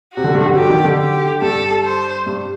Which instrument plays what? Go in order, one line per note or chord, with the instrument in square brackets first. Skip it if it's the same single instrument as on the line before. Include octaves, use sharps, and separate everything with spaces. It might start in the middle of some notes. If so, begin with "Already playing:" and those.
[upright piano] C3 [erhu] F#4
[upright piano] D3
G2
D3
[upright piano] F#3 [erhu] G4
[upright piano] D#3
D3
[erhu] G4
[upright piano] G2 [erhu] A4
[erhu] C5
[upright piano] G2